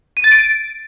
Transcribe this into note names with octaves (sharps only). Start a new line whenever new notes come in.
D#7
A6
D7